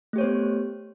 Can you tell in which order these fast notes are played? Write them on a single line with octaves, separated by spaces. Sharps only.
A3 G4 C#5 C5 B3